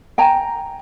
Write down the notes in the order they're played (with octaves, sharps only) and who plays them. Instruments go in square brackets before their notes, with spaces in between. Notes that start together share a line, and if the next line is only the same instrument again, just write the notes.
[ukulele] G5 G#5 A#5